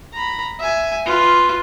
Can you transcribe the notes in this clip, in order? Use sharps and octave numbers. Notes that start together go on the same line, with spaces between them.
A#5 B5
E5 G#5
F4 B4